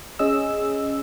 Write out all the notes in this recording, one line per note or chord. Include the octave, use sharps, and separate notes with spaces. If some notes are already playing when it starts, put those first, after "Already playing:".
C#4 G#4 D#5 E6